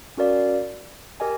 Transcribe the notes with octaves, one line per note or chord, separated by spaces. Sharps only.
C#4 F#4 A#4 D5 F5
G4 A#4 D#5 G#5